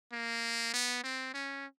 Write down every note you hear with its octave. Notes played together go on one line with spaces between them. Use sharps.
A#3
B3
C4
C#4